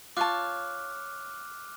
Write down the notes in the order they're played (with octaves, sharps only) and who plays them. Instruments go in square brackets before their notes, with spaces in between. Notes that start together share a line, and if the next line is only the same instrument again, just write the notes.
[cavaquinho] F4 C#5 A5 [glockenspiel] D6 F6 F#6